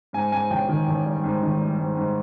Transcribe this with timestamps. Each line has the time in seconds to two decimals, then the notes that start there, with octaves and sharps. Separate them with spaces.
0.13 G#2 G#5
0.32 G#2 G#5
0.50 A1 G5
0.68 D#3
0.87 A1
1.06 G3
1.24 G#2
1.42 D#3
1.61 G3
1.79 G#2
1.97 G#2